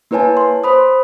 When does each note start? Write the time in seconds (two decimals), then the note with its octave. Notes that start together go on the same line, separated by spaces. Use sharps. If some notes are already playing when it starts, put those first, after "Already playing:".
0.11 A#3 E4 B4 C#5 G#5 A5
0.37 C6
0.64 C5 B5 D#6